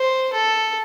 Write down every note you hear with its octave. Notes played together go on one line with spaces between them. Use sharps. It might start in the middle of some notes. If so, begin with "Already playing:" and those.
Already playing: C5
A4